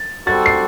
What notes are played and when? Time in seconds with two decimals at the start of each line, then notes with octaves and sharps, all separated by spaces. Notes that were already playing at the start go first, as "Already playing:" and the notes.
Already playing: A6
0.27 G3 C4 F#4 A4 A6
0.46 C7